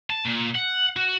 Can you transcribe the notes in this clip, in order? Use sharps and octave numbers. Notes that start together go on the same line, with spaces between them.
A5
A#2
F#5
F#4